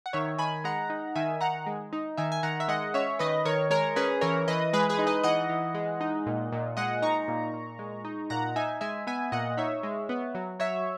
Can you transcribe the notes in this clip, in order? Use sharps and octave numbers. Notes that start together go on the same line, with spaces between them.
F#5
D#3 C#5 E5
D#3 G#5 B5
G#3 F#5 A#5
D#4
D#3 E5 G#5
D#3 F#5 A#5
G#3
D#4
D#3 E5 G#5
G#5
D#3 F#5 A#5
E5
G#3 D#5 F#5
C#4 C#5 E5
D#3 B4 D#5
D#3 A#4 C#5
G#3 A#4 C#5
C#4 G#4 B4
E3 A#4 C#5
E3 B4 D#5
G#3 G#4 B4
G#4 B4
D#4
B4 D#5
E3 D#5 F#5
E3
G#3
D#4
A#2
A#2
G#3 D#5 F#5
D#4 A#5 C#6
A#2
A#2
G#3
D#4
A#2 F#5 A#5
D#4 E5 G#5
G#3 E5 G#5
B3 E5 G#5
A#2 D#5 F#5
D#4 C#5 E5
G#3
B3
F#3
F#3 C#5 E5